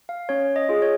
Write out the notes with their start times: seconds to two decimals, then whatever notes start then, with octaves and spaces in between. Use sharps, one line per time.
0.09 F5
0.29 C#4 C#5
0.56 D#5
0.69 F4 G#4
0.82 C#5